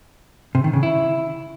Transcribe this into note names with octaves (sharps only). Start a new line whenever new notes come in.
C3
D#3
C#3
E4